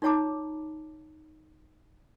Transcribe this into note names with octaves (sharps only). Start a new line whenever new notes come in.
D#4 F4 C#5 A5 A#5 D6